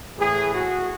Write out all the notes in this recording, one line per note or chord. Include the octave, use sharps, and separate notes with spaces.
A2 E3 G#4
F#4